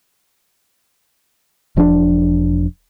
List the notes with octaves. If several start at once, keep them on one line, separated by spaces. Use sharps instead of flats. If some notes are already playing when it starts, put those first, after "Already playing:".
E1 F3 C#4 D4